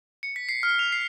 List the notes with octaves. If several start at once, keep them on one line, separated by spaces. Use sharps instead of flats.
C#7
B6
C7
F6
F7
C7